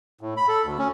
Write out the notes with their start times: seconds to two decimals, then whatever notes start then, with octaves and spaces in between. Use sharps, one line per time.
0.21 A2
0.37 B5
0.48 A4
0.64 D2
0.79 C#4